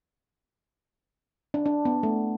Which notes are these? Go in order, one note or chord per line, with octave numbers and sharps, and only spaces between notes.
D4
D4
B3
A3